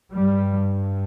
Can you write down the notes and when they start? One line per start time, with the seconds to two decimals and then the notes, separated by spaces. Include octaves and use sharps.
0.13 G2 G3